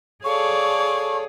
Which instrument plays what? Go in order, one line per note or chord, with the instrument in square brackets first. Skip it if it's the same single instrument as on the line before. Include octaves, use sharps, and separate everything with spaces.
[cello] G#4 [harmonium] A4 C#5 [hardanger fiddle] D5 F5 [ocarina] C#6